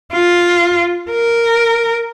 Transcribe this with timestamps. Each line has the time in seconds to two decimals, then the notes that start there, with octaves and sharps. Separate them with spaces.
0.13 F4
1.11 A#4